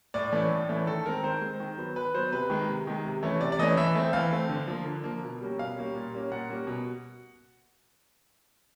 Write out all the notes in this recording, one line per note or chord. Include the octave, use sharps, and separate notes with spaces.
A2 D5
E3 A3 C#4
A2
E3 A3 C#4
D#3 A4
G#3 C4 A#4
D#3 C5
G#3
C4
D#3
F#3 B3
D#3 B4
F#3 B3 C5
C3 B4
D#3 G#3
C3
D#3 G#3
C3
E3 A3 C#4
C3 D5
D5
E3 A3 C#4 D#5
E3 E5
A3 C4
E3 F5
A3 C4
D3
F3 A#3
D3
F3 A#3
B2
G3 A#3 C#4
B2 F5
G3 A#3 C#4
A#2
G3 A#3 C#4
A#2 F#5
G3 A#3 C#4
B2